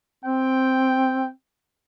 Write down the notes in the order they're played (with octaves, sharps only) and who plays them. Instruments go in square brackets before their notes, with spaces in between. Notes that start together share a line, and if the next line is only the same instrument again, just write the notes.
[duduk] C4 [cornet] G5